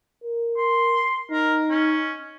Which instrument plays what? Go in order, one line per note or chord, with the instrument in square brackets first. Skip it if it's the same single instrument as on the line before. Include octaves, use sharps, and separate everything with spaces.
[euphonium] A#4
[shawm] C6
[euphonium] D#4 [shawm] A#4
[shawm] C#4